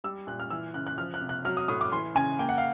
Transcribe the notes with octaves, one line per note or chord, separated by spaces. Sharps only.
G3 E6
A#2 F#6
F6
E3 E6
C#3 F#6
F#6
F3 F6
F#6
C3
F#6
F#3 F6
D#6
A2 D#6
D6
E3 C6
C#3 G#5
A#3 G5
F#5
F5